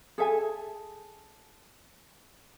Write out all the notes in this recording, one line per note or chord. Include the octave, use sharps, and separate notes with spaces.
G#4 A4 E5 G#5